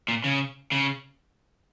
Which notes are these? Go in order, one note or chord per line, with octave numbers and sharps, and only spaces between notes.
A#2
C#3
C#3